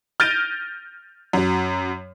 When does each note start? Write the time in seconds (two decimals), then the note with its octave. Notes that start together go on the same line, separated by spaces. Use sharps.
0.20 F6 G6 A6 A#6 D7 D#7
1.33 F#2 F#3